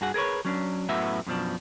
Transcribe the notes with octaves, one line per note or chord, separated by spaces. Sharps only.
G2 F#4 G#4 F#5
G#4 A#4 B4 C#5
F#3 C#4 D4
F#2 A2 B3 F#4 E5
F#2 B2 F3 D4